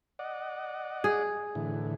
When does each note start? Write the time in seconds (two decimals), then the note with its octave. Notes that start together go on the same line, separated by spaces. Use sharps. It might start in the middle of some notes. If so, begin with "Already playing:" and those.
0.19 D5 D#5 F#5
1.04 G#4
1.55 A2 D3 E3